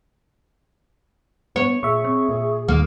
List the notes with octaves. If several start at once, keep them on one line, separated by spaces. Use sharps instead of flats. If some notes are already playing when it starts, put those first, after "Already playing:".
B3 C#5
A#2 G#4 E5 C#6
C4
A#2
D#2 A#3